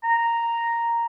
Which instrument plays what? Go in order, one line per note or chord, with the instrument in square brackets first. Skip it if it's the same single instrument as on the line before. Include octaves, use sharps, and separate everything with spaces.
[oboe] A#5